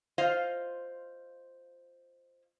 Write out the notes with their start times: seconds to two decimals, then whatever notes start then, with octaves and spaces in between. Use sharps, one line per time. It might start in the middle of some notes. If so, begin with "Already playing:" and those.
0.18 F4 C5 D#5 F5